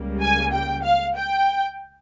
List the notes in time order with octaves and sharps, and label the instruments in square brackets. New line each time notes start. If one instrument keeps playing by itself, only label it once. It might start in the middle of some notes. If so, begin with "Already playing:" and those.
Already playing: [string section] C#2 C#3 G3 A#3
G#5
G5
F5
G5